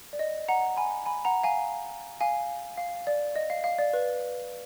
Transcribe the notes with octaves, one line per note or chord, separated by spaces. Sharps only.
D5
D#5
F#5 A#5
G#5 B5
G#5 B5
F#5 A#5
F5 G#5
F5 G#5
F5
D5
D#5
F5
F5
D5
B4